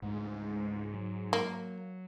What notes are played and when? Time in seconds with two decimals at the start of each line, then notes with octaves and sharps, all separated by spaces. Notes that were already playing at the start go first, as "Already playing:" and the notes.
0.02 C#2 G#2 G#3 A3
0.94 F#3
1.33 A#3